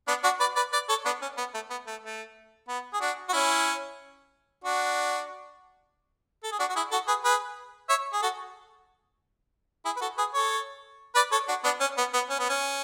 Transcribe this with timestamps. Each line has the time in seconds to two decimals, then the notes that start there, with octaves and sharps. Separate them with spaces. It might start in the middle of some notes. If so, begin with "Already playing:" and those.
0.08 B3 D4
0.24 D4 F#4
0.40 B4 D5
0.56 B4 D5
0.72 B4 D5
0.89 A4 C#5
1.05 B3 D4
1.22 C#4
1.37 B3
1.54 A3
1.71 B3
1.87 A3
2.03 A3
2.68 B3
2.93 G#4
3.01 D4 F#4
3.29 F#4
3.33 C#4 E4
4.64 D4 F#4
6.44 A4
6.52 G#4
6.59 D4 F#4
6.70 F#4
6.76 E4 G#4
6.92 F#4 A4
7.08 G#4 B4
7.24 G#4 B4
7.89 C#5 E5
8.13 G#4
8.22 F#4 A4
9.85 E4 G#4
9.96 B4
10.01 F#4 A4
10.18 G#4 B4
10.34 A4 C#5
11.15 B4 D5
11.32 A4 C#5
11.48 D4 F#4
11.64 B3 D4
11.80 C#4
11.97 B3
12.14 B3
12.30 C#4
12.40 B3
12.49 C#4